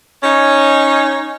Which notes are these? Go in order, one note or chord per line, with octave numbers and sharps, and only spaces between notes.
C#4 D#4 C#5